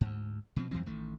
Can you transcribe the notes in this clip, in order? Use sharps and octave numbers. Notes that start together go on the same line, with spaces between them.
D2 G#2
B2 F3 C4
F2 E3 G3 C4
A1 D#3 A3